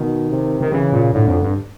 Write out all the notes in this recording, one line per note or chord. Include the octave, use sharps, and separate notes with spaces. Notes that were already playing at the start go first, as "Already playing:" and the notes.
Already playing: B2 D#3
C3
D#3
C#3 E3
A#2
A2 D3
F2
G2